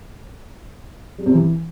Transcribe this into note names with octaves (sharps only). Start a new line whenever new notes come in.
G3
C3
E3